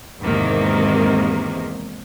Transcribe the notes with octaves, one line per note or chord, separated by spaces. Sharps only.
E2 G#2 C3 D#3 A#3